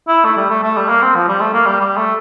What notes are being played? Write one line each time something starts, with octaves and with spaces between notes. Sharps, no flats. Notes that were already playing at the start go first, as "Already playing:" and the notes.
E4
A3
G3
A3
A3
G3
A#3
C4
F3
G3
A3
A#3
G3
G3
A3